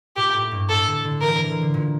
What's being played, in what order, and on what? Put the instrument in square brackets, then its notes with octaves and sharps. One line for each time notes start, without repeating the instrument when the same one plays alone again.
[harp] A#2 [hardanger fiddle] G4
[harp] A2
G2
[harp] A2 [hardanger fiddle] A4
[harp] D3
D3
[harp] E3 [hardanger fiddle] A#4
[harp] D3
D3
D3
A#2